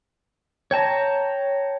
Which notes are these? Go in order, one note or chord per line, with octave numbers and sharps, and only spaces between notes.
C#5 G5 A5 A#5